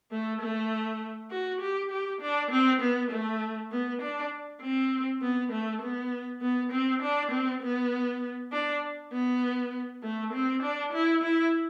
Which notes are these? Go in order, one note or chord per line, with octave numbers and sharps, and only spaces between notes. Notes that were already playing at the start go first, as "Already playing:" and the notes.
A3
A3
F#4
G4
G4
D4
C4
B3
A3
B3
D4
C4
B3
A3
B3
B3
C4
D4
C4
B3
D4
B3
A3
C4
D4
E4
E4